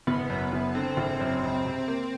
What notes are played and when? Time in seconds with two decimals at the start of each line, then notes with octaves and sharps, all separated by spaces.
0.07 F#1 B3
0.30 F#2
0.52 F#1
0.75 D3 C4
0.97 F#1
1.20 F#2
1.43 C#2
1.65 C3
1.88 A#3